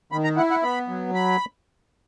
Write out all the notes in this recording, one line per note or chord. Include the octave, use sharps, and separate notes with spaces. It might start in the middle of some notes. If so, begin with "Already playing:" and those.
D#3 B5
A#5
E4 F#5
F#5
B3 B5
F#3
B5